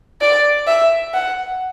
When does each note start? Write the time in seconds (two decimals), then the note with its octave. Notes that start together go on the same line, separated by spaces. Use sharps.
0.21 D5
0.68 E5
1.14 F#5